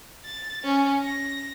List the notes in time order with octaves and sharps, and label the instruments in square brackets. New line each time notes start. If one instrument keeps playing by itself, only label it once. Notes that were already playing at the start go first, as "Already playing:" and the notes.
[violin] A6
C#4
A#6